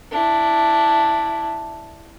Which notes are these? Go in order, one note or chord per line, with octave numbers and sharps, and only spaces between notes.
D4 E4